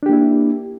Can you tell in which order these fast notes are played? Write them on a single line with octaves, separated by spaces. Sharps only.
D4 G4 A#3 E4